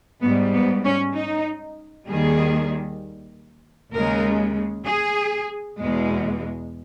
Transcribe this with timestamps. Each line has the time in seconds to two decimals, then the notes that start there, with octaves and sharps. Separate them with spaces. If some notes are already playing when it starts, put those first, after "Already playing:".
0.22 G#2 G3 B3
0.54 B3
0.84 C#4
1.15 D#4
2.07 D#2 D#3 G3 G#4
3.93 D#2 C#3 G#3 A#4
4.85 G#4
5.79 E2 B2 G#3